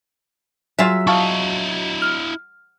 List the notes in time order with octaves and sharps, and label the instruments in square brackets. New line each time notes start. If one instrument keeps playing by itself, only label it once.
[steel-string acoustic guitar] F#3 [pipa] F4 G#4 E5
[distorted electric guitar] E4 D#5 [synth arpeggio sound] F5 A5 C#6
[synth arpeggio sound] F6